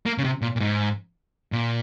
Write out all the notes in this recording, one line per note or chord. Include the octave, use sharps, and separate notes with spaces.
A#3
C#3
C3
A#2
A#2
G#2
A#2